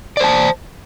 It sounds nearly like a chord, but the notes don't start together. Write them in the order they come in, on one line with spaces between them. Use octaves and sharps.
D5 C5 A5